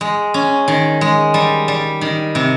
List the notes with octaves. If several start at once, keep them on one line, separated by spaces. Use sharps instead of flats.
G#3
C#4
D#3
G#3
G3
G3
D#3
C3